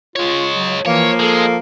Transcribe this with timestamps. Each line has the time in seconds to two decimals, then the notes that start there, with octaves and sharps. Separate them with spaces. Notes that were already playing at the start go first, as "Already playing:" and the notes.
0.16 G#3 F4 C#5
0.55 F#3
0.86 E3 F3 A#3 C#5
1.20 G#3 A4